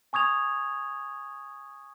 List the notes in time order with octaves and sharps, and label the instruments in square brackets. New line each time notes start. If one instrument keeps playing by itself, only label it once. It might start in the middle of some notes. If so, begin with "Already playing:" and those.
[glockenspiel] G#5 C#6 D#6 G#6 F7